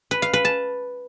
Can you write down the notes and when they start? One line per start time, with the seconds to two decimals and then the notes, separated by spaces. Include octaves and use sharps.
0.11 B4
0.22 F5
0.33 B4
0.45 A5